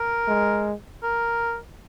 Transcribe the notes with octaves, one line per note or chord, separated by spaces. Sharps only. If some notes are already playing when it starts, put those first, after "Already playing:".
Already playing: A#4
G#3
A#4